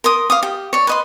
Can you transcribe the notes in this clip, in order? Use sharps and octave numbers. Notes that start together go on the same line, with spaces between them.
A#4 C6 D#6
F5 D6 D#6
G4
C#5 D5
B4 D#5 C6